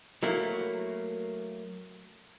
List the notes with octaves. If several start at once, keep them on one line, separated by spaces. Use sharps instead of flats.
F#3 A3 A#3 E4